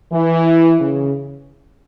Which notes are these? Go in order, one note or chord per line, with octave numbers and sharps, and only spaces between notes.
E3
C#3